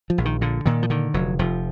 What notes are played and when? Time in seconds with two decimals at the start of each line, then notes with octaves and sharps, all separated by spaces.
0.10 F3
0.18 A#1
0.25 D#3
0.41 A#2 D3
0.66 A#2 D#3
0.83 F3
0.90 D3 D#3
1.14 F1 F#3
1.39 F1 F3